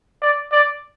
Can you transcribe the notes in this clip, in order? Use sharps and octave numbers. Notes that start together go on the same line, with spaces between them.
D5
D5